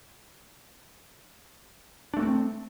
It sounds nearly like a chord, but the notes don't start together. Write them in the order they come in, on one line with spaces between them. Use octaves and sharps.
D4 A3 A#3 C4